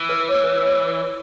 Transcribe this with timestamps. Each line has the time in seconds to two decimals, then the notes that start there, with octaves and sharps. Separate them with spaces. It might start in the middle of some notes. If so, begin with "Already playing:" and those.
Already playing: E3
0.09 B4
0.29 C#5
0.44 B4
0.48 C#5
0.63 C#5
0.69 D5